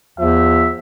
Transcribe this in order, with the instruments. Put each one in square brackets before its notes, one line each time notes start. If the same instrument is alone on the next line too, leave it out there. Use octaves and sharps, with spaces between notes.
[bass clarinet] E2 [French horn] F3 [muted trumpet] E5